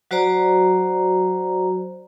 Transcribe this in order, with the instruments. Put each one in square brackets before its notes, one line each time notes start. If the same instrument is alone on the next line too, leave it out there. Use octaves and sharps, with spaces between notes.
[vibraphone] F#3 F#4 C5 D5 A#5